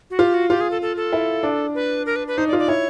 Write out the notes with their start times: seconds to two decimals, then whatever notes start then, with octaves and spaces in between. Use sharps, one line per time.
0.10 F#4
0.19 F4 G4
0.34 F#4
0.50 F4 G4
0.61 G#4
0.71 A4
0.82 A4
0.97 A4
1.12 E4
1.43 D4
1.75 B4
2.06 A#4
2.16 B4
2.27 B4
2.38 D#4 C5
2.48 D5
2.53 F4
2.59 D5
2.68 E4 C#5